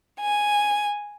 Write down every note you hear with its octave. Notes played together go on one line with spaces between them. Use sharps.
G#5